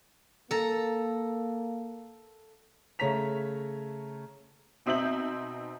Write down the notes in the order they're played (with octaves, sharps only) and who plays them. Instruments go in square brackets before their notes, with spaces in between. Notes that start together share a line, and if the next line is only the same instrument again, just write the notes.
[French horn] A#3 [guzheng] A4 A#5
[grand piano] C#3 A3 C#5 A#5 B6 F7
[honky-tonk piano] B2 C4 D#4 E5 G6 F#7